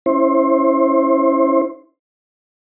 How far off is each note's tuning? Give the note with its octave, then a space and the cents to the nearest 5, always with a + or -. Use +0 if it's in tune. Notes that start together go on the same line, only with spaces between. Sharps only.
C#4 +0 E4 +0 C5 +25